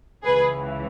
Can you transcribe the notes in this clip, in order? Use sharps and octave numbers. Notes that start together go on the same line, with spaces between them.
C#2 C#3 E3 G#4 B4